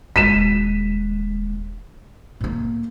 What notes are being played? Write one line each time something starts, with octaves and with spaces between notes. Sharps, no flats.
D#1 G#3 B6 D#7 E7
A2 A#3